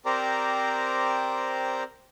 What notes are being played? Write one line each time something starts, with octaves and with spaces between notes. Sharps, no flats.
C4 G4 A#4 C5 D5 A#5